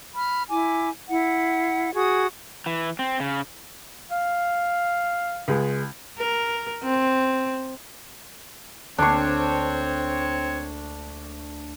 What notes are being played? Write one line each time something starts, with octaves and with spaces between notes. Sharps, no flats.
B5 F6
E4 G#5 D6
E4 F#5
F#4 G#4 D#6 G#6
E3
C4
C#3
F5
C#2 G#3
A#4
C4
D2 A#3 C4 D4 C#5 C#6 C7